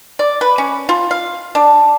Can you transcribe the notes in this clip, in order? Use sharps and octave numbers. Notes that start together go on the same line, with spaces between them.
D5
B4
C#4
F4
F5
D4